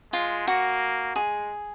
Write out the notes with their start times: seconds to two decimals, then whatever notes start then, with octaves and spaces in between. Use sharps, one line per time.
0.12 G#3 F4
0.47 A#3 F#4
1.16 G#3 G#4